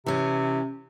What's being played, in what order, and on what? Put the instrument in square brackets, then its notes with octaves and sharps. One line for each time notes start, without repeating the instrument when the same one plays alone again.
[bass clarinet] C3 [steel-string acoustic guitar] E3 C#4